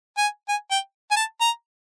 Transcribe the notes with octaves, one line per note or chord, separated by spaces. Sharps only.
G#5
G#5
G5
G#5
A5
A#5